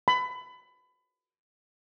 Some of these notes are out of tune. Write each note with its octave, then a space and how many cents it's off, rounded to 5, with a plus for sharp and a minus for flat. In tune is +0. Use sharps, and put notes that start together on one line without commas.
B5 +25